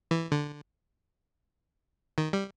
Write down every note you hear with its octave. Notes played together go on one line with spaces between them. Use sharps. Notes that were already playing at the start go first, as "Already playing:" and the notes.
E3
D3
D#3
G3